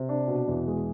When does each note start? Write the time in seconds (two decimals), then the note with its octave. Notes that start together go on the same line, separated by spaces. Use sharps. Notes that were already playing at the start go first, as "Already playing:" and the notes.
Already playing: C3
0.09 D4
0.28 B2
0.48 E2
0.67 G#3